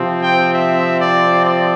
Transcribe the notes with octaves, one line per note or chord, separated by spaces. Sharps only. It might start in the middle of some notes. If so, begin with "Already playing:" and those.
Already playing: C3 F3 C4
G5
E5
D5
D5